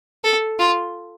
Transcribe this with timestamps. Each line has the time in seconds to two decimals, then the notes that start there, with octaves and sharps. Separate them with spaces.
0.24 A4
0.59 F4